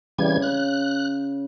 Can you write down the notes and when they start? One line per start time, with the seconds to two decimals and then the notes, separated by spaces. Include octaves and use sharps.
0.19 C#3 E3 G3 G#6
0.42 F#6